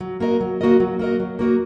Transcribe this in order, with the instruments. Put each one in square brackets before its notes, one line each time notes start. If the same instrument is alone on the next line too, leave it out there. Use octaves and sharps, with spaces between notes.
[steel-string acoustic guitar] F#3
A#3 F#4 A#4 D#5
F#3
A#3 F#4 A#4 D#5
F#3
A#3 F#4 A#4 D#5
F#3
A#3 F#4 A#4 D#5